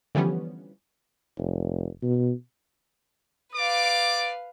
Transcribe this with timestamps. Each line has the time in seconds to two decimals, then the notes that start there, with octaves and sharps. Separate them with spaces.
0.15 D3 E3 F3 G3 B3 C#4
1.38 F1
2.03 B2
3.56 B4 D5 F5 D6